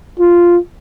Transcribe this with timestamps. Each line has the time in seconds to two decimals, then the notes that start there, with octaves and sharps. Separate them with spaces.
0.20 F4